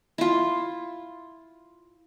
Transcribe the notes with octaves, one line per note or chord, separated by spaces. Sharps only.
E4 F4